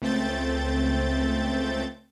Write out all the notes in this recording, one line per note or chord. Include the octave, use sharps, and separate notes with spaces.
C#2 A3 C4 G6 A6